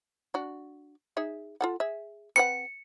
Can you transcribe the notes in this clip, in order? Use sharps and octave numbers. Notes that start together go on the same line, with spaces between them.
D4 F#4
D#4 G#4 E5
F4 A4 F#5
G#4 E5
C4 B4 F#5 C#7